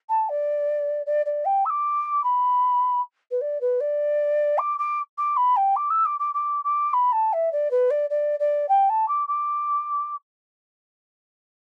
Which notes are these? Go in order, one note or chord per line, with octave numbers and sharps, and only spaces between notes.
A5
D5
D5
D5
G5
E6
D6
B5
B4
D5
B4
D5
D6
D6
D6
B5
G5
D6
E6
D6
D6
D6
D6
B5
A5
E5
D5
B4
D5
D5
D5
G5
A5
D6
D6